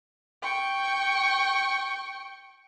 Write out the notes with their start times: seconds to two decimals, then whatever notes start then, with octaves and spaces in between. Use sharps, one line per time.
0.43 G5 C#6